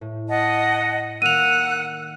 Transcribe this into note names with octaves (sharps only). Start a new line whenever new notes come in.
A2
D#5 F#5 A5
D#3 A#3 F#5 E6 F#6 D#7 F7